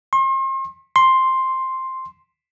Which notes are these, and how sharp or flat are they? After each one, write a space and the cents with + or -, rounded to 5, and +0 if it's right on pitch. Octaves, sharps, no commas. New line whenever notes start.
C6 +40
C6 +5